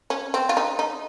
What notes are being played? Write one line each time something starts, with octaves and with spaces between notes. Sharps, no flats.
C#4
C4
F4
D#4
D#4